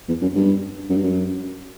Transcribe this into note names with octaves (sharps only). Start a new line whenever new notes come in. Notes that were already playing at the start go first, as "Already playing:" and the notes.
E2
F#2
G2
F#2
G2
F#2